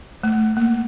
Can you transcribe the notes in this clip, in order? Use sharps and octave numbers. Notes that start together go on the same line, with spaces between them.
A3
A#3